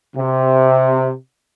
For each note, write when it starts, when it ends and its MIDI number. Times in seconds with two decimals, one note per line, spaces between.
0.17 1.13 48